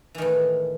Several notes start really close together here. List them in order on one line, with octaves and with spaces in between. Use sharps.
E3 D#3 A2